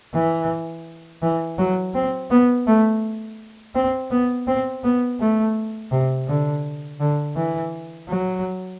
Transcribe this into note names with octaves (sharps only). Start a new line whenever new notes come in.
E3
E3
F#3
C4
B3
A3
C4
B3
C4
B3
A3
C3
D3
D3
E3
F#3